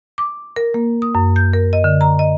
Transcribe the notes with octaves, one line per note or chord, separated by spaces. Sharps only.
D6
A#4
A#3
D#6
F#2
G6
A#4
D#5
D3
A#5
D#5